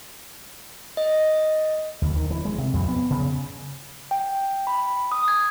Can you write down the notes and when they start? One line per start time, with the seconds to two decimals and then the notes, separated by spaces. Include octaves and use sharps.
0.97 D#5
2.02 D2
2.15 D#3
2.31 E3
2.45 G#3
2.58 C3
2.74 F2
2.89 B3
3.10 C#3
4.11 G5
4.67 B5
5.12 D#6
5.28 G#6